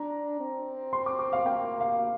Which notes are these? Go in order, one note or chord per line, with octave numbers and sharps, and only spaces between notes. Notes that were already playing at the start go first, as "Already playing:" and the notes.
Already playing: D4 A#5
C4
C6
D6
D6
F5
A#3 G5
F5